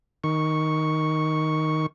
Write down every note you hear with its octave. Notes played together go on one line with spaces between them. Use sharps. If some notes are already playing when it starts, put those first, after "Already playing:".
D#3 C#6